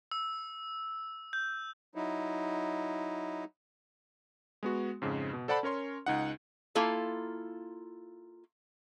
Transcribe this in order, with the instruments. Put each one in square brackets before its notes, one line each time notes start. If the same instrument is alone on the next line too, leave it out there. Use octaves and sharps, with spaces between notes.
[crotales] E6
G6
[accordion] F#3 D#4 E4
[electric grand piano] G#3 B3 F#4
F2 G#2 C#3
B2
A4 C5 D5 F#5 A5 B5
C#4 A#4 C#5 C6
C#2 D#4 F#5
[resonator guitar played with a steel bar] A#3 E4 F4 A4